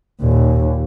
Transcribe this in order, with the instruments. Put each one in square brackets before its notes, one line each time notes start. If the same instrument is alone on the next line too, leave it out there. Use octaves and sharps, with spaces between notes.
[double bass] D#2 A#2